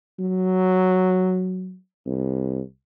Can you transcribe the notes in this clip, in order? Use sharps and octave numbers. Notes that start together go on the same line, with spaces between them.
F#3
C2